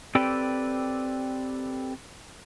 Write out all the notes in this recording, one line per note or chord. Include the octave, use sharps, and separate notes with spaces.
C4 G4 A4 B4 D5 G5